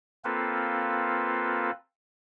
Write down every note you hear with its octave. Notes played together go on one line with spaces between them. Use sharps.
A#3 C4 F4 A4 B4